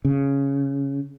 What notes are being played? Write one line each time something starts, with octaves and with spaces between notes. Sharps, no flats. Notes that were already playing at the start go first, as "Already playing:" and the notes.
C#3